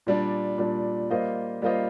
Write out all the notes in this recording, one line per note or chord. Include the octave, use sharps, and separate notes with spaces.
A#2 G3 D4
A#2 G3 D4
G3 A#3 F4 C5 D#5
G3 A#3 F4 C5 D#5